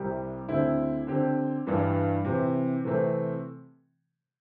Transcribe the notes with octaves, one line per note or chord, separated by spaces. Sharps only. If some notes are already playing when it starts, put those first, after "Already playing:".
Already playing: C2 C3 G3 C4 G4
D2 D3 C4 E4 G4
D3 C4 G4
G2 E3 G3 D4
C3 E3 C4 G4
C3 E3 A3 C4